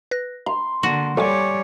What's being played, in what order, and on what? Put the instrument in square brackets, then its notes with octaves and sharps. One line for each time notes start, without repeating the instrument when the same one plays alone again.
[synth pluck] B4 F#6 A#6
[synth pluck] A#5 [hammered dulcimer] C6
[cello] D3 A#3 [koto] F#4
[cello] G3 C#5 [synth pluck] A4 C#6 [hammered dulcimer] D5 G#5